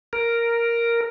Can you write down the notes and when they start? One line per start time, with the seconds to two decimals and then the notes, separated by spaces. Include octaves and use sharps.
0.13 A#4